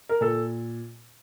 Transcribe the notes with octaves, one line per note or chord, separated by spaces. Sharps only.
A#4
A#2 A4